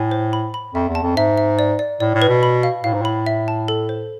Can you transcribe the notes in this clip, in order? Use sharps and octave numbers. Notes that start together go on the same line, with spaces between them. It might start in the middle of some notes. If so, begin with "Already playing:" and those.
Already playing: A2 G#5
C5
B5
B5
F2 E5
E2
A5
F2
G#2 E5
E5
D5
D5
A2 D5
A2
B4
B2
B5
F5
A2 F5
G#2
A2 B5
E5
A5
A4
C5